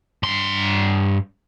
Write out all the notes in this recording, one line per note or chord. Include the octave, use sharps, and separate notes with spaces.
G2 C6